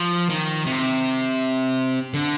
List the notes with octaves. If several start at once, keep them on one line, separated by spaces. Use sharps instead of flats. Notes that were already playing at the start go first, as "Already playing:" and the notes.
Already playing: F3
D#3
C3
D3